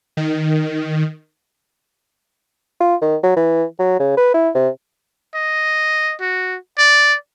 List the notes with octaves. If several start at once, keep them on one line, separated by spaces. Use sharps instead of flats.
D#3
F4
D#3
F#3
E3
F#3
C#3
B4
E4
C3
D#5
F#4
D5